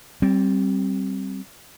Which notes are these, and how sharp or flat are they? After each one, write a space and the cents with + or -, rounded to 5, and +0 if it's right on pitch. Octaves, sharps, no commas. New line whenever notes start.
G3 -20 C4 +15